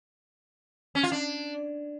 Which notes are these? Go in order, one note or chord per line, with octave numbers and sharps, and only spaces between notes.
C#4
F4
D4